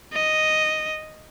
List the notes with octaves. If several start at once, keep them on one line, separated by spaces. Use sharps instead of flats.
D#5